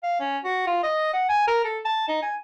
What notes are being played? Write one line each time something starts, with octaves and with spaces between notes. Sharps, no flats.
F5
C#4
F#4
F4
D#5
F#5
G#5
A#4
A4
A5
D#4
G#5